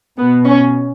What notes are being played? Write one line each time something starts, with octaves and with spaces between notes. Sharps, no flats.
B2 B3
C#4